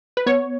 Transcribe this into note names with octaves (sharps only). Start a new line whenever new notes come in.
B4
B3 C#5